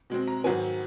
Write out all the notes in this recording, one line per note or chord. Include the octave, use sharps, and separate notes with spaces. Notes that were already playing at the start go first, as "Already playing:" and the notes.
B2 G#3 C4
A#5
G#2 D#3 F#3 B3 G#5